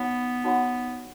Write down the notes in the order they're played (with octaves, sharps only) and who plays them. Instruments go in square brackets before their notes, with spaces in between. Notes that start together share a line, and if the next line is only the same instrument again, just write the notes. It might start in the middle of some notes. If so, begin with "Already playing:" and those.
Already playing: [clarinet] B3 [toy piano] D#4 F#4 C#5 F#5 B5
[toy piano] D#4 F#4 C#5 F#5 B5